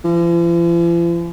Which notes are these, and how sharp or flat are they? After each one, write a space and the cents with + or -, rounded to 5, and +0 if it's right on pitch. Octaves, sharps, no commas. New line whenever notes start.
F3 -45